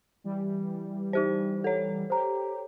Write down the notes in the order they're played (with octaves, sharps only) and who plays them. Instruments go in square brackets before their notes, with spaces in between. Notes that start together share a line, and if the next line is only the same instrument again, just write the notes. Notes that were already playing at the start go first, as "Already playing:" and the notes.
[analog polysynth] E3 G3
[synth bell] D#4 G4 C5
A4 C#5
[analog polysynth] G4 [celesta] C5 A#5